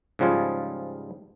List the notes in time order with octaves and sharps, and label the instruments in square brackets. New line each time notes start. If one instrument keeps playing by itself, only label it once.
[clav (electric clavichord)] G#2 C#3 F3 G3 F4 G#4